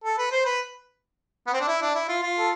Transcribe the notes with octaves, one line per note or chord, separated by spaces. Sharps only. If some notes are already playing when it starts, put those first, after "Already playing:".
A4
B4
C5
B4
B3
C4
D4
E4
D4
E4
F4
F4
A4